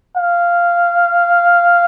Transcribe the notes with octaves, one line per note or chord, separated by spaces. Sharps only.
F5